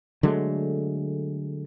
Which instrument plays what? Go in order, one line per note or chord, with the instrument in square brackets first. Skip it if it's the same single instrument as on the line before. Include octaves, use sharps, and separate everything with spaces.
[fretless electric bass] D3 F#3 G#3 A3